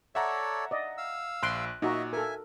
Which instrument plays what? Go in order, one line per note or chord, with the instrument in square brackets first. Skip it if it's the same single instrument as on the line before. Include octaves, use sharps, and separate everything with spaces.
[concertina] A4 C#5 D5 [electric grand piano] E5 F#5 A#5
[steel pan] D5 D#5
[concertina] F5 E6
[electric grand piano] A#1 F#6 D7 [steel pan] C6
[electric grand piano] A#2 [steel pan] D#4 F#4 A#5 [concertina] D#5 E5
[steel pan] A4 A#4 [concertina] E5 G#5